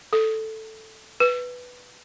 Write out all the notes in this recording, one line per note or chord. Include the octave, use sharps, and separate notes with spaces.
A4
B4